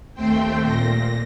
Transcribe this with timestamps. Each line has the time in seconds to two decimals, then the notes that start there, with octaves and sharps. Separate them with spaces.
0.14 D#2 A3 C4 C5 G5
0.61 A#2 A#6